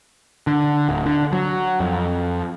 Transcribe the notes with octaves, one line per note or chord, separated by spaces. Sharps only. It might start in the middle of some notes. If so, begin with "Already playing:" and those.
D3
D1
D3
F#3
F2